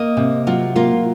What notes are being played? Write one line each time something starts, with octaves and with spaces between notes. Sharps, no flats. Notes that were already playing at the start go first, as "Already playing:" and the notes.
Already playing: A#3 D#5
C3
F#3 F4
A#3 F4